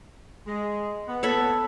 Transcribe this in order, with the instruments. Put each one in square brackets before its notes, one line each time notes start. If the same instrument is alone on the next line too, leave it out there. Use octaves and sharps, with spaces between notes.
[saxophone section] G#3
B3
[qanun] A4 C#5 B5